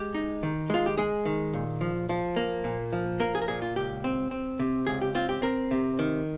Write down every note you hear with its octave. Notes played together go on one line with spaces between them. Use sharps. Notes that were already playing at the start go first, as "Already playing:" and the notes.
Already playing: G#3 G4
D#4
D#3
G#3 F4
G4
G#3 G#4
D#3
A#2
F3
F3
A#3
A#2
F3
A#3 A#4
G#4
A#4
A#2 G#4
F4
C#2 G4
C4
C4
C3
C#2 G#4
G4
C4 F4
G4
C4 A#4
C3
D#3